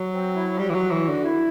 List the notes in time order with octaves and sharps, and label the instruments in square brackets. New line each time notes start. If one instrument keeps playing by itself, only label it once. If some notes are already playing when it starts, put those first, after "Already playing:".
Already playing: [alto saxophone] F#3
[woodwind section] C4
E4
[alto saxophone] G3 [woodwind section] F#4
[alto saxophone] E3
F#3
E3
D3
[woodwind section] E4